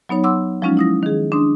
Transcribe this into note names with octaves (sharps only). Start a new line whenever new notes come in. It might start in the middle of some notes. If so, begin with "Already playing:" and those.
F#3 B3 D#4 C#5
F#5 C6 D6 E6
F3 F#3 G#3 C#4 D#4 F4
E4 D#6 A#6
D#3 G#4
D4 C6 D#6